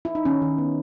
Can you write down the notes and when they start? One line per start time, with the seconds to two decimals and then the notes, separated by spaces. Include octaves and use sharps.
0.05 E4
0.15 D#4
0.25 D#3 C#4
0.42 D#3
0.58 B3